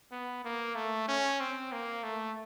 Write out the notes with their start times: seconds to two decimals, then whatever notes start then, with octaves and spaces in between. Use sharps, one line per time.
0.12 B3
0.44 A#3
0.75 A3
1.08 C#4
1.40 C4
1.72 A#3
2.03 A3